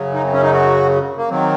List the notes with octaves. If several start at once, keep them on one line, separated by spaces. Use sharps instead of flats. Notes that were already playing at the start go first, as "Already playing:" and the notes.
Already playing: F#2 C#3 F#3
D#4
C4
C#4
D#4
F#4
A#3
D#3 F#3 C4